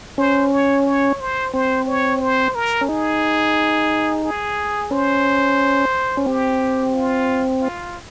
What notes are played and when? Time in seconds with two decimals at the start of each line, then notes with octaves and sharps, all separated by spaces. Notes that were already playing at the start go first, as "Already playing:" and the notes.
0.18 C#4 C5
0.52 C#5
0.87 C#5
1.20 C5
1.54 C4 C5
1.87 C#5
2.21 C5
2.55 A#4
2.81 C#4
2.89 D#4 G#4
4.24 G#4
4.91 C#4 C5
6.17 C#4
6.26 C4 G4
6.94 F4
7.61 F4